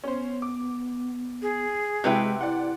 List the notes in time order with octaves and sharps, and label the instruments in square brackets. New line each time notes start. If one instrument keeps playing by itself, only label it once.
[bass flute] B3 [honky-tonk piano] C#4 C5
[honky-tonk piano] D6
[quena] G#4
[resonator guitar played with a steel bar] C3 B4 G5 [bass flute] G#3 [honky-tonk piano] E4 F#4
[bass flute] E4 [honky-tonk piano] D5 F#5